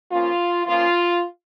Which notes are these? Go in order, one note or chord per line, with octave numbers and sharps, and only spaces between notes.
F3 A#3 C#4 F4
F3 A#3 C#4 F4